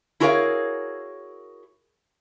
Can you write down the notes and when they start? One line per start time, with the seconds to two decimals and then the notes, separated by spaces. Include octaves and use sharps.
0.20 E4 F#4 G#4 A#4 C#5 F5